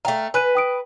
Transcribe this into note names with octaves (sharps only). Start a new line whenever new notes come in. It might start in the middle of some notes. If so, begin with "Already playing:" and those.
A3 F5 G5 A#5
B4 G#5 F#6 D#7
G5 D#6 D7